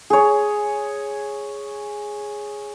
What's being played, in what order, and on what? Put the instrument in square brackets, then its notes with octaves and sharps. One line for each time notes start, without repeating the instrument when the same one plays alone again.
[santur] G#4 C#5